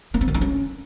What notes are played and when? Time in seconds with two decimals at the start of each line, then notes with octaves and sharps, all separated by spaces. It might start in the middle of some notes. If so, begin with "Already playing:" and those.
0.14 A#3
0.21 C4
0.28 D#3
0.34 D#4
0.41 C#4